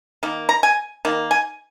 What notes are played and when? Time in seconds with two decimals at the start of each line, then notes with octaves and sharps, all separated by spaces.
0.23 D#3 A#3
0.49 A#5
0.63 G#5
1.05 D#3 A#3
1.31 G#5